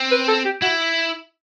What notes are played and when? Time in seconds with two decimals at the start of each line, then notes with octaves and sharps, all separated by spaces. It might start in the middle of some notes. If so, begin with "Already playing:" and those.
Already playing: C4
0.11 B4
0.28 A4
0.45 G4
0.62 E4 F#4